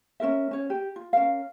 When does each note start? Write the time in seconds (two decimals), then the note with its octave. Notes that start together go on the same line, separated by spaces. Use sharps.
0.20 C#4 F4 A#4 E5
0.51 C#4 C#5
0.70 G4
0.96 F4
1.13 C#4 A#4 F5